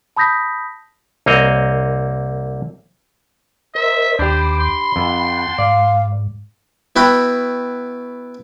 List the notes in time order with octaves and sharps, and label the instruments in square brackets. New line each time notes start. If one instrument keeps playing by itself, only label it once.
[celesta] A5 B5 D#6 G6 A#6 B6
[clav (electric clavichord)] C2 A#3 C4 C#5 D#5
[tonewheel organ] A#4 C5 D#5 [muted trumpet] E5
[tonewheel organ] D#2 D6 [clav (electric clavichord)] D4 G4 [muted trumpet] C5 [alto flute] B5
[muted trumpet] C6
[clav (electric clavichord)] F2 [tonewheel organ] F#5 G5 A5
[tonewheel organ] G#2 [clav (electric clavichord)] D5 [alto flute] F5
[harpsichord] B3 E4 F#4 G5 B5